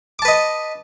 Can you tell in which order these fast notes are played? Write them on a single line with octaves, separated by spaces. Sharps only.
D6 A5 B4 D#5